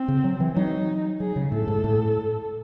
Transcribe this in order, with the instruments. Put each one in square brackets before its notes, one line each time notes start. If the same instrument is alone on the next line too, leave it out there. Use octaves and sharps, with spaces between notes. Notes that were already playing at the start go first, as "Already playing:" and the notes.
Already playing: [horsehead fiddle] C4
[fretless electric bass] C#3
F#3
E3
[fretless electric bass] F#3 [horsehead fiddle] D#4
[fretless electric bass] F#3 [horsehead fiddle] G#4
[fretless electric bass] C#3
[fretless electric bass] A2 [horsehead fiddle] A4
[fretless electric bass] G#2
A2